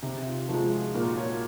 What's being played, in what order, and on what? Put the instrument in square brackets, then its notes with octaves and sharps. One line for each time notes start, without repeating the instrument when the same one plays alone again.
[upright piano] C3 [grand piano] D#4
[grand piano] F4
[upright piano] F3 [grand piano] D#4 F#4
[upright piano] G#3
[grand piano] F4 G#4
[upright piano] A#2 [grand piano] F#4 A#4
[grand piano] A#4 C#5